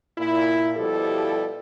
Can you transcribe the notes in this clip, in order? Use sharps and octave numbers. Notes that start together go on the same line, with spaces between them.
A#2 E4
B2 F3 G3 E4 G4 A4